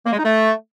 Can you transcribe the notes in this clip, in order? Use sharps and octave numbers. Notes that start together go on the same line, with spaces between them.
A#3
G#3
D#4
A3